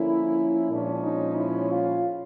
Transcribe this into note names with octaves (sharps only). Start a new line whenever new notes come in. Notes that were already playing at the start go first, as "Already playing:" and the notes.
Already playing: D3 F3 A#3 C#4 E4
A#2 F3 G#3 C#4 D4
D#4
E4
F4